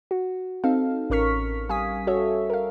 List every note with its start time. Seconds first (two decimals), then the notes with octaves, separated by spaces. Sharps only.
0.11 F#4
0.64 C4 D#4 A4 F5
1.10 A1 C#4 A#4 C#6 F6 B6
1.69 G3 F5 G#5 D#6 B6
2.07 F#4 A4 C#5 E5
2.50 A#4 F5